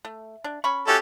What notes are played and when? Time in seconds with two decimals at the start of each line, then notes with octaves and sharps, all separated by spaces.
0.05 A3
0.44 D4
0.64 C#4 B5 C#6
0.87 A3 C#4 F#4 G4 A4